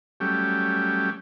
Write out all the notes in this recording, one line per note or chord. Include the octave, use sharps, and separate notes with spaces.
F#3 G3 A3 C#4 G4